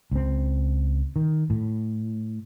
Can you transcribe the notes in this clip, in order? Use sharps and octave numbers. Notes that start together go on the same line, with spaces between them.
C#2 C4
D#3
A2